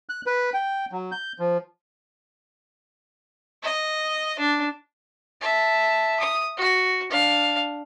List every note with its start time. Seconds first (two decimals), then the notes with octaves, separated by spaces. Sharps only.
0.09 F#6
0.26 B4
0.54 G5
0.92 F#3
1.12 G6
1.39 F3
3.63 D#5
4.39 D4
5.41 E5 A5
6.20 D#6
6.58 F#4
7.10 D4 F5